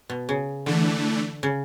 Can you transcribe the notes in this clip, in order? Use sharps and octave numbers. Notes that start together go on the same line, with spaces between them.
B2
C#3
D3 E3 A3 D4
C#3